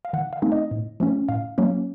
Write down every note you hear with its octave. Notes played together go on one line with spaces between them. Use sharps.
F5
D#3 F#5
F5
A3 C4 D#4
D#5
A2
F3 A3 C#4
A2 F5
F#3 A#3 C#4